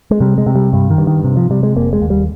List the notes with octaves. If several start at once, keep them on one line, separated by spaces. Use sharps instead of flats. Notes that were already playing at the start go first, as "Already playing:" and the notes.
G#3
C3 G3
G#3
C3
G3
G2 G3
D#3
G2
D#3
C3
F3
C3 G3
G#3
F1 A#3
G#3
D#2
G3